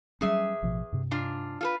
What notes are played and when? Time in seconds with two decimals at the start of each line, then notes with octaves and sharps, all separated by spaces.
0.21 E2 F#3 G3 C#4 G#4 E5
0.63 A1 B2 F3
0.92 G2 C3
1.11 G#2 D4 F4
1.61 F4 A4 B4